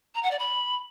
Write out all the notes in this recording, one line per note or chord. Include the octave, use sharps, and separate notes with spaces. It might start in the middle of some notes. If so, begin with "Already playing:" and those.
A#5
F#5
D5
B5